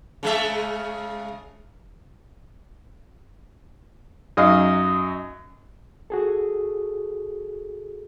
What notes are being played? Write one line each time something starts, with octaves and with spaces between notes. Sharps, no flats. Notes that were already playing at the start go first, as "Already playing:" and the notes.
C#3 G#3 E5
F#2 D#4 F#4 D#5 F5
F#4 G#4 A4